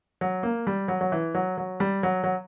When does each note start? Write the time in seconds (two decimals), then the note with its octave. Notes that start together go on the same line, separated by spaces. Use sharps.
0.21 F#3
0.43 A#3
0.67 G3
0.88 F#3
1.01 F#3
1.12 E3
1.35 F#3
1.58 F#3
1.80 G3
2.03 F#3
2.24 F#3